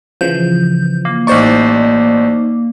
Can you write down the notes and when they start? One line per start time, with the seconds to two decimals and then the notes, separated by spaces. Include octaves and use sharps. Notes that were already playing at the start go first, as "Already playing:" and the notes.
0.21 C#3 E3 F3 G6
1.05 A#3
1.27 A1 D#4 C5 D5 C#6